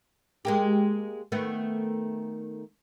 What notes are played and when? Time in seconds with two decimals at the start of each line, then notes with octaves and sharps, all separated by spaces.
0.45 G#3 A#3 G4
1.32 D#3 A3 B3